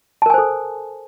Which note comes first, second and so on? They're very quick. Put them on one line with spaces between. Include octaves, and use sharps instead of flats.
A5 A#4 G#5 C5 A4